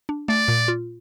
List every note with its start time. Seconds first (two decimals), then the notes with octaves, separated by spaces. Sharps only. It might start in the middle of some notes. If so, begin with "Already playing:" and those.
0.09 D4
0.28 A3 D5
0.48 A#2
0.68 F4